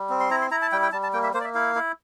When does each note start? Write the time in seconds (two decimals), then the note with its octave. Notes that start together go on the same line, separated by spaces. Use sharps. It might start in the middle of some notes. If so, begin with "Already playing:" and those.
Already playing: G3
0.10 C4
0.20 C6
0.31 E4 A#5
0.41 C6
0.51 E4 A#5
0.62 A5
0.72 G3 G5
0.83 G5
0.92 G3 A5
1.03 A5
1.13 A#3 G5
1.23 E5
1.34 A#3 C5
1.41 D5
1.44 E5
1.55 E4 F5
1.75 E4